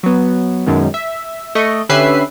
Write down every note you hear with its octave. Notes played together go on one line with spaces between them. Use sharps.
F#3 B3
F#2 B2 D#3 G#3
E5
A3 D#5 C#6
D3 C#4 G4 B4 E5 C7